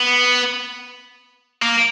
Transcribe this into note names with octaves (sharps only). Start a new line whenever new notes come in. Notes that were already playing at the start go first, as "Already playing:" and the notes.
Already playing: B3
A#3